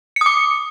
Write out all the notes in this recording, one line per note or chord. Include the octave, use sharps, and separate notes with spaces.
D6 D#6 C#7